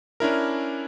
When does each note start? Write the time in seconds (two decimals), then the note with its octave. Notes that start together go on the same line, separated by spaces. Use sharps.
0.20 C#4 D4 E4 A#4